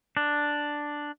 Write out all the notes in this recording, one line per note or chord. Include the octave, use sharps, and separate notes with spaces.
D4